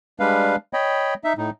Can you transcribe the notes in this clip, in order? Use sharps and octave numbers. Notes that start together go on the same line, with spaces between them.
G3 G#3 D4 B4 F5
C#5 D#5 G5 B5
D#4 E5
A2 D#4